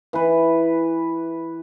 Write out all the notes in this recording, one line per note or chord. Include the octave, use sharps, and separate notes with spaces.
E3 B4